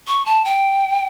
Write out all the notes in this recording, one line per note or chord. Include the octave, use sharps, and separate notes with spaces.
C#6
A5
G5